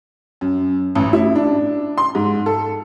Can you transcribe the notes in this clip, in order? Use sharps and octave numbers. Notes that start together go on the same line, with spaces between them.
F#2
A1
E4
D4
C6
G#2
A4